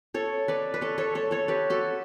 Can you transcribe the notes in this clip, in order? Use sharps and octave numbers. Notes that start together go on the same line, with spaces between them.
A4 C#5
B4 D5
B4
A4 C#5
A4 C#5
A4 C#5
A4 C#5
G4 B4
F#4 A4